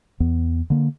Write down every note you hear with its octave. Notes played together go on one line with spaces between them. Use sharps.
E2 E3 B3
D3 A#3